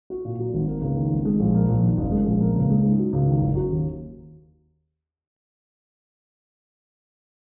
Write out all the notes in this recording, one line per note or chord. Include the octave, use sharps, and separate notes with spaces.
F#4
A#2
F#3
G#1
A#3
C#2
D#3
G#1
G#3
A#1
A#3
A#1
D#3
F#1
G#3
A#1
A#3
C#2
G#3
G#2
F#3
C#2
D#3
F#1
F#3
D#2